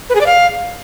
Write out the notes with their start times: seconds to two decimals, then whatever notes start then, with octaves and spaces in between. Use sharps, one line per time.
0.10 B4
0.15 G#4
0.21 D5
0.26 F5